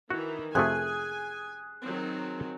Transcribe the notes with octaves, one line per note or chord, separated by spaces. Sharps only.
D#3 E3 F#4
F2 C3 A3 G#4 G#5 F#6
D#3 F#3 C4